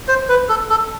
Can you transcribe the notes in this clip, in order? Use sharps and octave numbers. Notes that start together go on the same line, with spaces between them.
C5
B4
A4
A4